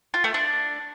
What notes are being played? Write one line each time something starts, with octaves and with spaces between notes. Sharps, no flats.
F4
A3
D4